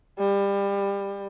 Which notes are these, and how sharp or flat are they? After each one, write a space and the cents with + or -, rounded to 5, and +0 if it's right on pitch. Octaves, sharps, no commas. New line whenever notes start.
G3 +25